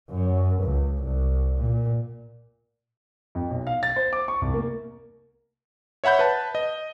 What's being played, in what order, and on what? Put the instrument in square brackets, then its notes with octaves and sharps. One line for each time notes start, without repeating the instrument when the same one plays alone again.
[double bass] F#2
C#2
C2
A#2
[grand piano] F2
B1
F5
A6
C5
D6
C#6
C2
A#3
[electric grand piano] C#5 E5 F#5 B5 G6
B4 A5
D#5